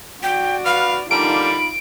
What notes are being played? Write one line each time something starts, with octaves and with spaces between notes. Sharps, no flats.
F#4 D5 G5
B4 F5 F6
D3 G3 A#3 D#4 F4 B5 D7